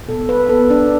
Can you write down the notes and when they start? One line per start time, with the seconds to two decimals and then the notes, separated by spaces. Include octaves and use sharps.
0.08 B2 A4
0.29 B4
0.49 B3 A4
0.70 D4